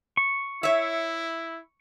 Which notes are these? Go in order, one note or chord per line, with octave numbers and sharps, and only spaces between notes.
C#6
E4 C#5 E5